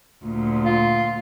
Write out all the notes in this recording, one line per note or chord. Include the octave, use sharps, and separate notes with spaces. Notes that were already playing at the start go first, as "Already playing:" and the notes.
D2 A#2
F4